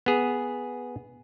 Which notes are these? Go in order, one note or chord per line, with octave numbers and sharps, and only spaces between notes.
B3 G#4